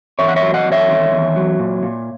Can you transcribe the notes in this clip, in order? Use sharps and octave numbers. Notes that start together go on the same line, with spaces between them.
E2 C#5 E5
F#5
C#5 E5
F#3
D#5 F#5
E2
C#5 E5
D#3
E2
F#3
A#2
A#2